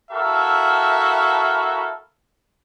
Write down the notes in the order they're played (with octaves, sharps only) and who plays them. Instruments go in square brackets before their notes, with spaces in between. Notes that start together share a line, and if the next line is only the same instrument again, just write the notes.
[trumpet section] E4 F#4 A4 A#4 E5 F5